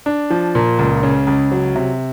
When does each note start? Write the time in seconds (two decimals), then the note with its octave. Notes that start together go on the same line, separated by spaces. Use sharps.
0.06 D4
0.30 F3
0.55 A#2
0.79 C#2
1.03 C#3
1.27 C#2
1.51 F#3
1.76 C3